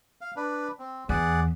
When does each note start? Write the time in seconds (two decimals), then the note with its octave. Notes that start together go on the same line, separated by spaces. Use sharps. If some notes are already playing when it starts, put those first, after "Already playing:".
0.21 F5
0.36 D4 B4
0.79 C4
1.09 E2 G#4 D5 F#5